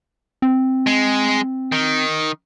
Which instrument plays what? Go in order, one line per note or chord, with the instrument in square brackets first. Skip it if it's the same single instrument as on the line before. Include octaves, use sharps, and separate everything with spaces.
[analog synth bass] C4
[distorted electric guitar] G#3
D#3